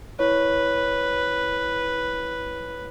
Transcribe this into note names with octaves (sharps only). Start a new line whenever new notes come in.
E4 B4 C#5